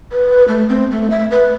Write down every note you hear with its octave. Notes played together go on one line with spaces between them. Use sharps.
B4
A3
C4
A3
E5
B4